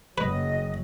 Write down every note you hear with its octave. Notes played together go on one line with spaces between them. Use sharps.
F#1 F#3 B4 D#5